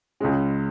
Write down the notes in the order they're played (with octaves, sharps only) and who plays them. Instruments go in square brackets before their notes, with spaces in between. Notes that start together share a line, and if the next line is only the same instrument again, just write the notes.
[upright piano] C#2 C#3 G#3 C#4